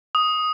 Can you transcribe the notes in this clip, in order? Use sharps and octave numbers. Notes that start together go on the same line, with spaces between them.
D#6